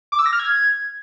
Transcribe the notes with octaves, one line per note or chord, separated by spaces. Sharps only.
D6
E6
A#6
F6
G#6